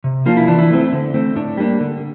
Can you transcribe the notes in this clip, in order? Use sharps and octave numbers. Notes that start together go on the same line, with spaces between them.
C3
F3 A#3 D4 F4
E4
E3 D4
E4
A3 C4
D3
A3 C4
A2 D4
G3 A#3 D4
D3